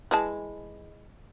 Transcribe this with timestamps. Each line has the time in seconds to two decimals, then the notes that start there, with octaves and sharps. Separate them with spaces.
0.11 E3 G#3 A5